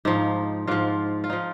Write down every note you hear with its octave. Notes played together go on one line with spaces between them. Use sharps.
G#2 F3 D#4
G#2 F3 F4
F4
F3 D#4